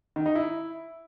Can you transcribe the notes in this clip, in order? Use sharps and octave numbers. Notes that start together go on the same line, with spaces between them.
D#3
D#4
E4